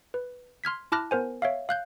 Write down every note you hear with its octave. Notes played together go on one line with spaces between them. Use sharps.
B4
C6 F6 G#6 B6
E4 A5 D6 F6 F#6 A#6
B3 A#4 C5 G#5
C#5 E5 F5
F5 F#6 G6